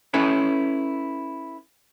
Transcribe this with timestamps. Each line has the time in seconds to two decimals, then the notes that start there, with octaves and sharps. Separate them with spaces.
0.14 C#4 E4 A4 B4 C#5